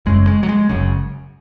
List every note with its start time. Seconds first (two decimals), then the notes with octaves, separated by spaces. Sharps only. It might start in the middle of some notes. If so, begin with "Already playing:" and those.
0.06 F#1 F#2 C#3 G#3
0.27 G#3
0.43 F#3
0.49 G#3
0.69 F#1 F#2 C#3